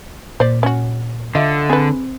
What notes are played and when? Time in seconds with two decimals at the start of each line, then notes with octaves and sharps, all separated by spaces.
0.40 A#2 C5 D5
0.63 C#4 F#4
1.35 D3 F4 D#5 E5
1.70 C4 G#4 B4